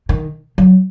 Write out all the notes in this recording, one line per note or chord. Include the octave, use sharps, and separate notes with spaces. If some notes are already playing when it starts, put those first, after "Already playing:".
D#3
F#3